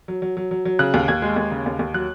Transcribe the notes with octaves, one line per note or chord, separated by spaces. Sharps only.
F#3
F#3
F#3
F#3
F#3
C#3 F#6
D#2
D#2 G#6
G#3
D#2
C#3
D#2
D#2
F#3 F#6